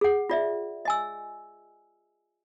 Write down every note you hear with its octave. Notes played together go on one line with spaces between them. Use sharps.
G#4 F#5
F4 D5 E5
D#5 G#5 E6